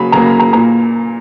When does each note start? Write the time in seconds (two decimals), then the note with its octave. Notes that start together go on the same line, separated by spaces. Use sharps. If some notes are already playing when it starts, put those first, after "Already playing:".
Already playing: C#3 F#3 A#3 B5
0.12 C#3 F#3 A#3 A#5
0.26 B5
0.40 A#5
0.53 A#2 A#3 A#5